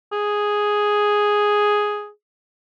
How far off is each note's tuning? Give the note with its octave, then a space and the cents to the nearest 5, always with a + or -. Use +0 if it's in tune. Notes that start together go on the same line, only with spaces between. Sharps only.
G#4 +0